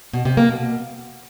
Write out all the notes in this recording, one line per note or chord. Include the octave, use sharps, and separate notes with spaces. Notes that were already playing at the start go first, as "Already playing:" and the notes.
B2
C3
A#3
B2